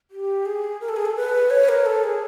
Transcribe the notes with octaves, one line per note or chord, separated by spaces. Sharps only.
G4
G#4
A#4
A4
G#4
A4
B4
C#5
A#4
A4
G#4